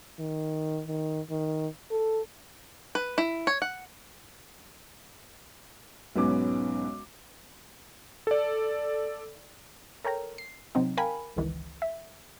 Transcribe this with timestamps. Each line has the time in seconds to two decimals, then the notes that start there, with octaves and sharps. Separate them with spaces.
0.19 D#3
0.87 D#3
1.30 D#3
1.91 A4
2.95 B4
3.18 E4
3.47 C#5
3.62 F#5
6.16 B1 G#2 B3 C#4 D6
8.27 A4 D5
10.05 A4 A#4 C#5 G5 A#5
10.38 C7
10.75 C3 F#3 C4 D#4
10.97 A#4 F5 G5 G#5 B5
11.36 G1 C#2 D#3 E3
11.82 E5